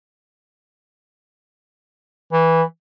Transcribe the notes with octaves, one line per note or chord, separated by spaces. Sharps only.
E3